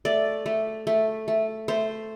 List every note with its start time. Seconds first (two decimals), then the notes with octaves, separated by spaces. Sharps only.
0.05 A3 D5
0.46 A3
0.87 A3
1.28 A3
1.68 A3 C5